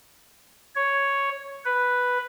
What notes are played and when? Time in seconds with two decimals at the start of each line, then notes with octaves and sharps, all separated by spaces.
0.76 C#5
1.65 B4